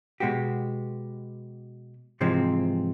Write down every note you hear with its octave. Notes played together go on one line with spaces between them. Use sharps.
B2 G#3 B3 F#4 G4
G#2 C3 E3 F3 G#3 C4